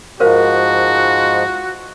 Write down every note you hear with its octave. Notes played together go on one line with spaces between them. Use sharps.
G#2 F3 F#4 A#4 C5 F5